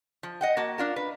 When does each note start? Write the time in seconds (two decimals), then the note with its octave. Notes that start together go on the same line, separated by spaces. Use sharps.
0.23 F3
0.41 D#5 F#5 G5
0.57 A#3 F#4 A5
0.78 D4 F4 A#4
0.96 B4